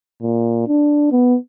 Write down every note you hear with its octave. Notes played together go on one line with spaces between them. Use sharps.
A#2
D4
B3